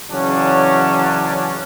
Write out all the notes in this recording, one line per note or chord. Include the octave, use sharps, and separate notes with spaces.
C#3 E3 F#3 C#4 D4